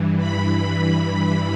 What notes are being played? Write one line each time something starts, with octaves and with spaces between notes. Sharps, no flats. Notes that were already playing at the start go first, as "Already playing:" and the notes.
Already playing: G2 E3
B5